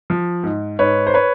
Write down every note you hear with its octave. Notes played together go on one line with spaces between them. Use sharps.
F3
G#2
G#2 B4 C#5
C5
B4 C#5